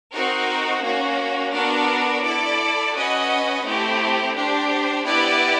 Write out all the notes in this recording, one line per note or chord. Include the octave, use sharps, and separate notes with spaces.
C4 D#4 F#4 A#4
A#3 C#4 F#4
B3 D4 F#4 A#4
E4 A4 D5
C#4 F#4 B4 D#5 F#5
A3 C4 E4 G4
D4 G4 C5
B3 E4 G4 B4 D5